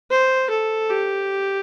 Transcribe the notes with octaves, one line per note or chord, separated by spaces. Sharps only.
C5
A4
G4